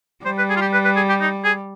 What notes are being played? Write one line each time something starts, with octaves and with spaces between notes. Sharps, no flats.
G3 C5
B4
G#4
F4
G4
B4
B4
G#4
G4
D#4
G#4